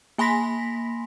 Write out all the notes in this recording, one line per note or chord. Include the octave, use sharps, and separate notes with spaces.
A#3 G#5 B5 C6 A#6 B6